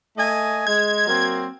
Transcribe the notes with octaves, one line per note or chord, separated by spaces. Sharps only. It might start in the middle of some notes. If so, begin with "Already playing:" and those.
A3 D#5 G#5
G#3 G#6
F#3 A#3 C4